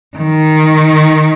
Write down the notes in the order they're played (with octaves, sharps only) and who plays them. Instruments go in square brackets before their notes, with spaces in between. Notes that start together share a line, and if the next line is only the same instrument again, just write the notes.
[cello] D#3